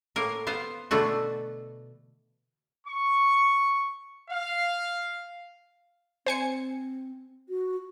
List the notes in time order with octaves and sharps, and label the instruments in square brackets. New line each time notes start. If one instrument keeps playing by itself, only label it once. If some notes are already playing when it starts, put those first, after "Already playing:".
[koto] A2 A#3 A#4
B3 C5 F5
B2 D3 E3 A3 F#4
[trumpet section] C#6
F5
[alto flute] C4 [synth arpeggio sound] C5 G#5 C#7
[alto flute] F#4